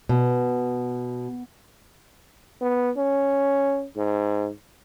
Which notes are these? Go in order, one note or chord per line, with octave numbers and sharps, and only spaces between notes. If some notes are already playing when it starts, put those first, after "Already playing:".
B2
B3
C#4
G#2